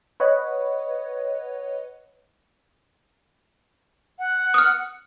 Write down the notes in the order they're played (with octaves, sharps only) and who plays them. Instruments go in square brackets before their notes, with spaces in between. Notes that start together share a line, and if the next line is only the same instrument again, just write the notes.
[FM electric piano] B4 C#5 D#5 F#5
[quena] F#5
[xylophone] D#6 F6